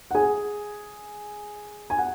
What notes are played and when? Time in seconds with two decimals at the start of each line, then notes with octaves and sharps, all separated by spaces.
0.11 F#5
0.15 G#4 G#5
1.90 G#5
1.98 F#5